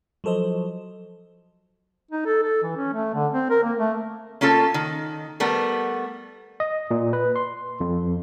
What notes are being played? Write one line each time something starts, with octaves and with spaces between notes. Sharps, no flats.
F3 F#3 A4 C5 D#5
D#4
A4
A4
E3
C#4
A3
D3
C4
A#4
A#3
A3
A#3 C#4 F4 A4
D#3
G3 A3 B3 A#4
D#5
A#2
B4
C6
F2